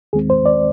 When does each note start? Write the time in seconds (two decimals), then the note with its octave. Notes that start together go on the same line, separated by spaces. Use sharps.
0.13 D#2 D#3 G#3 C4 G#4
0.30 C5
0.46 D5